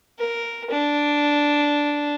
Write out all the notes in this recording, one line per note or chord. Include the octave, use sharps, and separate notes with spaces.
A#4
D4